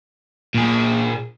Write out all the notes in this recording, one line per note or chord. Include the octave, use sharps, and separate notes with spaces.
A#2 G#4